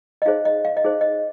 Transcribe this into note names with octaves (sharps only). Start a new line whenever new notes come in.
D#5
D#4 G#4 C5 F5
D#5
F5
D#5
D#4 G#4 C5
D#5